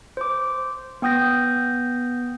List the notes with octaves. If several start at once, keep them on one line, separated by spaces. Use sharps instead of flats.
C5 D6
B3 G5 D#6 G6 A#6